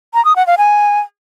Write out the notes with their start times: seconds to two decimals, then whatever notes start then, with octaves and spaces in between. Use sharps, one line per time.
0.14 A#5
0.25 D#6
0.36 F#5
0.47 F5
0.58 G#5